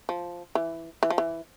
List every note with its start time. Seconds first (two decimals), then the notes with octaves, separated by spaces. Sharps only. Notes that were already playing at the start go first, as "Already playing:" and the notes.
0.09 F3
0.55 E3
1.03 E3
1.10 F3
1.18 E3